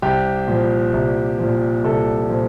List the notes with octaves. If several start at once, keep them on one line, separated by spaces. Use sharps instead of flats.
C2 G4
A#2 F3
C2
A#2 F3
C2 A4
A#2 F3